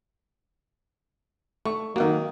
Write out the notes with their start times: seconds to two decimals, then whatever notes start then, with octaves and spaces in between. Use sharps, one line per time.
1.66 A3 C#6
1.96 D#3 F#3 A#3 F#5